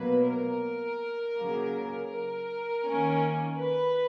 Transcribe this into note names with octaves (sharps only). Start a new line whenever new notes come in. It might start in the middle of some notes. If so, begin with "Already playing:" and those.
Already playing: B2 F#3 A#3 B4
A#4
C#3 F#3 A#3
A#4
D#3 A#3 C#4
B4